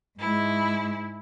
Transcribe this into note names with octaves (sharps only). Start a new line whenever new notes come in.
G#2 G#3 E4